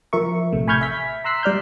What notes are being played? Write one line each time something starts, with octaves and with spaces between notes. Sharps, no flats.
F3 A#4 E5 C#6
A1 C3 A3
G#5 B5 C#6 F6 G6 G#6
E5 B6
A#5 C6 E6 F#6 B6 C7
G3 D5 F6 G6